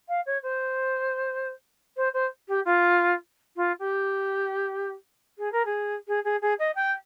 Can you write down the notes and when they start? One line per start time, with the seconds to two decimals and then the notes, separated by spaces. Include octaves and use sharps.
0.08 F5
0.26 C#5
0.43 C5
1.97 C5
2.14 C5
2.48 G4
2.65 F4
3.56 F4
3.79 G4
5.38 G#4
5.52 A#4
5.65 G#4
6.08 G#4
6.24 G#4
6.42 G#4
6.59 D#5
6.75 G5